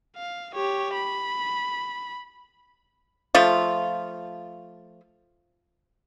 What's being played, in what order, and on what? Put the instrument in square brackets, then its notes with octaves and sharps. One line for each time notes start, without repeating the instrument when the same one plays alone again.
[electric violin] F5
G4 C#5
B5
[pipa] F3 A3 F4